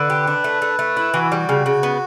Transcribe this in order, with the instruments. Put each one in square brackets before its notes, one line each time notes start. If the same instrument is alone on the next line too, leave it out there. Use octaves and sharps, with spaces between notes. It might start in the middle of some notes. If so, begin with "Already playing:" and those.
Already playing: [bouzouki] D3 [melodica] B4
[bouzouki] G4
D4
A3
A3
A3
E4
[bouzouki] E3 [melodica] F#4
[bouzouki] G3
C#3
C#3
B3